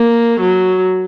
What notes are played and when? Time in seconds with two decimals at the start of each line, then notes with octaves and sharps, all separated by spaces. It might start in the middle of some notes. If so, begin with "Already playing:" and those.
Already playing: A#3
0.40 F#3